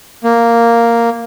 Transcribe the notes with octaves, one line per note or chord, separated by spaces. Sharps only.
A#3